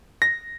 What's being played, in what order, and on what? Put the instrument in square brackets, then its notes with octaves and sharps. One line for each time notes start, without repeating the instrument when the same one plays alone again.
[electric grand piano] A#6